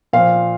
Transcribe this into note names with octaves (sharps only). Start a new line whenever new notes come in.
A#2 F3 F5